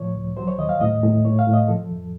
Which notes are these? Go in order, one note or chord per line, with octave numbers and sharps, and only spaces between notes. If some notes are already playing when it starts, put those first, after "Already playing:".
Already playing: A2 F3 C#5
C#2
F#3 C5
C#5
D#2 D#5
F5
A2 D#5
A2
A2 C#5
F5
A2
D#5
F3 A4
F2